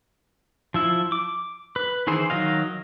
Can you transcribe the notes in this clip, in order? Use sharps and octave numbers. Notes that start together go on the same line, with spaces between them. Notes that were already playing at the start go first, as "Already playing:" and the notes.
F3 E4 E5
D6
B4
D#3 E3 G#4 C5
D#3 F#3 D#5 F5